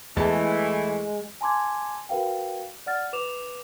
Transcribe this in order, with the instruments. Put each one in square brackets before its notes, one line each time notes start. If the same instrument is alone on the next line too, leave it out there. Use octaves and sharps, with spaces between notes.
[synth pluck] E2 A5 [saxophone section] E3 A3 [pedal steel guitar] G#3
[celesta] G#5 A5 C6 D6 G#6
F#4 A#4 B4 F5 G5
D5 F#5 F6 A6
B4 D6 E7 F7